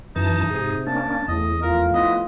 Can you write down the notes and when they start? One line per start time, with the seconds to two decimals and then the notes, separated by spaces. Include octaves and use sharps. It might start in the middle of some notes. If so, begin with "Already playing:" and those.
0.16 F#2 E3 D#4 A5
0.50 G#2 C3 G#4
0.87 A#3 C#4 D4 A5
1.28 E2 A2 C#3 D#5
1.62 F3 A3 F4 A#4
1.94 B3 E4 D#5